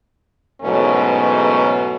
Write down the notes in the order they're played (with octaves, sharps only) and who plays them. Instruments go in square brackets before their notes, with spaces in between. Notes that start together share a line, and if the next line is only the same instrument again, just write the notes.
[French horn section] E2 G#2 B2 F#3 A3 C#4